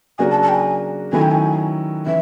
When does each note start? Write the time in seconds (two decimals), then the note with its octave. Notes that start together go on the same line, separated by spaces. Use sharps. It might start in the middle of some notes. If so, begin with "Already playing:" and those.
0.19 C#3 F#3 A#3 D4 F#4 G#5
0.31 A5
0.43 A5
0.49 G5
0.55 G#5
1.13 D#3 F#3 A3 C#4 E4 G#5
1.22 G5
1.31 G#5
2.06 E3 C#4 E5